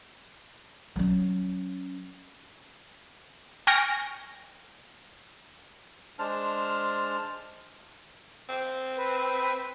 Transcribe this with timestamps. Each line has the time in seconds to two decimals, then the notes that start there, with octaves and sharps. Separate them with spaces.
0.96 F#3 C#4
3.67 G5 G#5 C#6 F6 A#6 D7
6.19 G#3 D4 C5 A5 F6
8.49 C4
8.96 B4